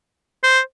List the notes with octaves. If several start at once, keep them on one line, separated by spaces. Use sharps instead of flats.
C5